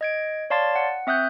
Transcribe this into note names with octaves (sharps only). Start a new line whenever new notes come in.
D#5 G#6 D7
C#5 D5 F5 A5 C6 A6
F#5
C4 E5 D#6 F#6 G6